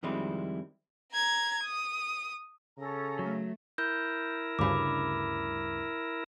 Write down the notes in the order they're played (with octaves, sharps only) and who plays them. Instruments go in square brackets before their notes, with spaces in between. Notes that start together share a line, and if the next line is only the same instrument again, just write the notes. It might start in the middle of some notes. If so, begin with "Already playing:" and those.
[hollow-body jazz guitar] F2 D#3 G3 G#3 C4 E4
[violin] A#5 G#6
D#6
[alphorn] C#3 [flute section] C#4 A4 A#5
[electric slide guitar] F#3 [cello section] A3
[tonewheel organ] E4 A#4 [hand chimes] G6
[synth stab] D2 G2 C#3 [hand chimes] B5 D6